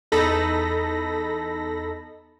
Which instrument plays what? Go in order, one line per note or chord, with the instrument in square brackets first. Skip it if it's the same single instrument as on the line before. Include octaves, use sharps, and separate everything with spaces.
[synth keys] E2 D#4 A4 B5 A#6